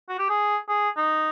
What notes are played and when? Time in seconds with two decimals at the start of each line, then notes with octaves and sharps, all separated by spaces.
0.09 F#4
0.19 G4
0.30 G#4
0.69 G#4
0.97 D#4